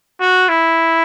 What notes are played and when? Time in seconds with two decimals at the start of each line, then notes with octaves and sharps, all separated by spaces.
0.21 F#4
0.49 E4